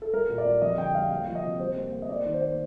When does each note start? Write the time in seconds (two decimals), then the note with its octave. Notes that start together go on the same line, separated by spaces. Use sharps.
0.02 A4
0.13 G3 A#4
0.29 A#2
0.38 D5
0.46 G3
0.62 F2 D#5
0.78 D3 G5
0.94 G3 F5
1.11 A#3 F5
1.27 F3
1.35 D#5
1.43 C3
1.60 G3 C5
1.76 A#3
1.93 A#3
2.02 D#5
2.09 A#3 D5
2.25 D#3
2.34 C5
2.41 A#3